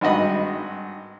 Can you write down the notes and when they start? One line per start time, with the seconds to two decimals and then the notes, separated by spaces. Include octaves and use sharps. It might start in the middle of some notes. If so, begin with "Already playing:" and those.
0.01 G#1 G2 F#4 D#5 B5